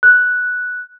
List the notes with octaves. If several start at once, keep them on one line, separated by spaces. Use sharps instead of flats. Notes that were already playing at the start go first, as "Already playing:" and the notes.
F#6